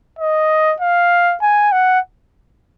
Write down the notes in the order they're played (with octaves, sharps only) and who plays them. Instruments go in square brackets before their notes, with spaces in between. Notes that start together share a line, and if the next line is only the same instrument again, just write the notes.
[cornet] D#5
F5
G#5
F#5